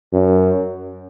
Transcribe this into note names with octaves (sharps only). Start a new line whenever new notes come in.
F#2